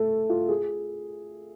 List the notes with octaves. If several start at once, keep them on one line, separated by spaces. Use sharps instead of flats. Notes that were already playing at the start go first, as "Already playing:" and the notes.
Already playing: A3
F4
G#4